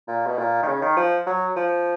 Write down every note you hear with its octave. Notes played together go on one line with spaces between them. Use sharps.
A#2
B2
A#2
D#3
C#3
D#3
F3
F#3
F3